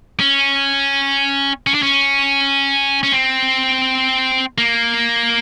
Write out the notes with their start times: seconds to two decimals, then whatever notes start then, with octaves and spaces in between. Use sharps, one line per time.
0.20 C#4
1.67 C#4
1.74 D4
1.82 C#4
3.03 C#4
3.12 C4
4.58 A#3